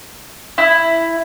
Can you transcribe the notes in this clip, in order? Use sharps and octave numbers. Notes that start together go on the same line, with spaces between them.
E4